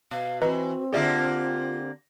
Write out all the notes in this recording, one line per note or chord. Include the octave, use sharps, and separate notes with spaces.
B2 F5
E3 C4 F#4 B4 D#5 A#5
D3 A#3 F4 G4 G#4 D5 E5